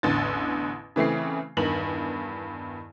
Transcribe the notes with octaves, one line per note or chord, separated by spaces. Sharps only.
A1 E2 D3 A6
C#3 E3 A3 C4 C7
E2 G2 D#3 F#7